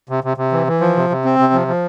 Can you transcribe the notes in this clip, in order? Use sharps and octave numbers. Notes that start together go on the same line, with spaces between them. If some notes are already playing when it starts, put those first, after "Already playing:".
C3
C3
C3
E3
E3
F3
C3
C3
C4
C3
F3
F3